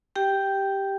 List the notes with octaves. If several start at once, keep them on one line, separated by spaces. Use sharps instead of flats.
G4 G5